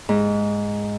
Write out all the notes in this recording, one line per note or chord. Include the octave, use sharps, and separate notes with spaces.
G#2